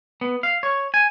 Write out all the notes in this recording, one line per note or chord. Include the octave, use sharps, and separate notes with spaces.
B3
F5
C#5
G#5